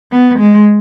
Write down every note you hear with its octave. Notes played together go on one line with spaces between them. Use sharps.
B3
G#3